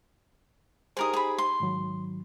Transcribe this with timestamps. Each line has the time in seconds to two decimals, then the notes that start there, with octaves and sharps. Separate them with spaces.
0.97 D#4 G4 G#4 A#4 C5 D#6
1.13 G#4 B5
1.38 C6
1.60 G#2 D#3 F#3